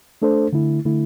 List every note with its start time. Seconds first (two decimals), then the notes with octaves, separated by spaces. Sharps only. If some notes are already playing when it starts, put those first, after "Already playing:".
0.22 A3 D4 A4 C5
0.53 D3 A3 E4
0.85 D3 A3 E4